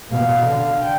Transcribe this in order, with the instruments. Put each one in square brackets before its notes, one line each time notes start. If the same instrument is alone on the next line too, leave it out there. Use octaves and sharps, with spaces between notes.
[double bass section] B2 [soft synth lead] F5
[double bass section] D3
[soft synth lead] G5